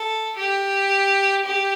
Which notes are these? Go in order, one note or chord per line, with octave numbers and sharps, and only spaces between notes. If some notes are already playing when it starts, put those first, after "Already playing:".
Already playing: A4
G4
G4